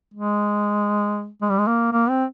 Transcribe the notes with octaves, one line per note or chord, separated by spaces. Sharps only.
G#3
G#3
G3
G#3
A#3
A#3
C4